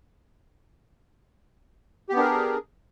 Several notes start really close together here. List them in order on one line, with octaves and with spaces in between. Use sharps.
G4 B3 D4 A#4 G#4